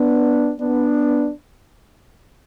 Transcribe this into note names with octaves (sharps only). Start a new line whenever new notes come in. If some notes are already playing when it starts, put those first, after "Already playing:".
Already playing: B3 D4
B3 D4